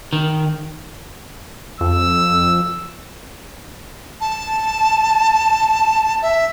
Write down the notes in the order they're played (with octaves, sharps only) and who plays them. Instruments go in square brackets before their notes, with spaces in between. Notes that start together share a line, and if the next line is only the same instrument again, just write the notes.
[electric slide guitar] D#3
[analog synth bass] F2 [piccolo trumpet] E6
[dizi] A5
E5